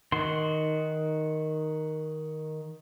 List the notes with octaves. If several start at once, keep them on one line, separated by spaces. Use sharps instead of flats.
D#3 F#4 C6